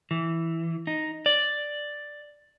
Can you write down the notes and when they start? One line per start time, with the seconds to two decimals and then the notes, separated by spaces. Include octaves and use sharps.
0.11 E3
0.87 D#4
1.26 D5